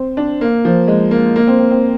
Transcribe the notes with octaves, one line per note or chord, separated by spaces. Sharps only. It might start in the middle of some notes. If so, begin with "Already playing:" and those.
Already playing: C4
D4
A#3
F3
G#3
A#3
A#3
C4
C4
C4